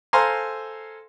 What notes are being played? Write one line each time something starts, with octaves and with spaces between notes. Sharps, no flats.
A4 C5 F5 G#5 A#5 C6